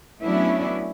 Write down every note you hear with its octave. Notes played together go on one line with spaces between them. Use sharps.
F#3 A3 B3 C#4 D4 E4